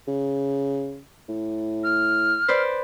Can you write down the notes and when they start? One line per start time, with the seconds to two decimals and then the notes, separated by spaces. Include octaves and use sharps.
0.07 C#3
1.29 A2
1.84 F6
2.48 B4 C5 D5